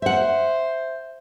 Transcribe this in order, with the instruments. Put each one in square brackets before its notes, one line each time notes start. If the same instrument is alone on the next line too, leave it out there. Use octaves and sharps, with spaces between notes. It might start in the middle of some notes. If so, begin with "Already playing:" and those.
[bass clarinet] C5 [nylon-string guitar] E5 F#5